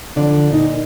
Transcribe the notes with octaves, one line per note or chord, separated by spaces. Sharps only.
D3 F3 D5
A#2 D#4